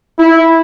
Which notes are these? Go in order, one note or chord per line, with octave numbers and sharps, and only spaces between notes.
E4